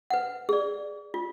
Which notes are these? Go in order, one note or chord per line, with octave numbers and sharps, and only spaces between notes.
B4 F#5
G#4 D5
F4